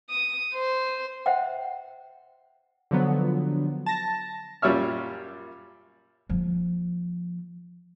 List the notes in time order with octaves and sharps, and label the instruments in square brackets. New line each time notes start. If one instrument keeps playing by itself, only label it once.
[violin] D#6
C5
[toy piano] C5 E5 F#5 G5
[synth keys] D3 F3 F#3 B3
A5 A#6
[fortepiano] F#2 A#2 G3 C#5 E5 F6
[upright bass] F3 A#3